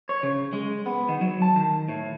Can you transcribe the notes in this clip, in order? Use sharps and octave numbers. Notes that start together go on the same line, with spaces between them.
C#5
C#3
G#3
B3
D#3
F#3
A5
D#3
A2